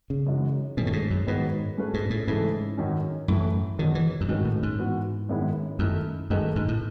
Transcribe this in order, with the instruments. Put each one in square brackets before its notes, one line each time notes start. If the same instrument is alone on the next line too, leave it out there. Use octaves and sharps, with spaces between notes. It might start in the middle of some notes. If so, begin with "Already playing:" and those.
[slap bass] C#3
[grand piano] F#2 E3 G#3 D#4 F#4
[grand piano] F#2 D#3 A3 C#4 [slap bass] B2
[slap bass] A2
G#2
F#2
[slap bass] G#2 [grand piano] D#3 F#3 B3 F#4 B4
[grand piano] F#3 A3 C#4 G#4 B4
[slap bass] G#2
A2
[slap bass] G#2 [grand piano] C#3 E3 A3 E4 A4
[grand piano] F#2 D#3 F#3 C#4
[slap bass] F#2 [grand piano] A2 E3 A3 E4
[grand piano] E2 B2 F#3 [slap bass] D#3
[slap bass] E3
F#2
[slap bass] G#2 [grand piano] D#3 F#3 C#4 F#4 B4
[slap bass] A2
G#2
[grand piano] E3 B3 F#4
F#2 D#3 G#3 B3 E4
[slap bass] F#2 [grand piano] D#3 A3 E4
[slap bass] F#2 [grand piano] D#3 A3 D#4 G#4 B4
[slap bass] G#2
A2